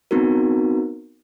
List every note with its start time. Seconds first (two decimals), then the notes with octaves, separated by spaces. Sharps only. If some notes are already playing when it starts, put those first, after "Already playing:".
0.11 B3 C4 D#4 F#4 A#4